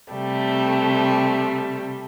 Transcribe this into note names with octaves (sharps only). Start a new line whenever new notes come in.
C3 G3 A3